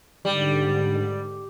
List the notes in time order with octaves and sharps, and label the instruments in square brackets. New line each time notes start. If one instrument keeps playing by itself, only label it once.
[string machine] G#2 D3 [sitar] G3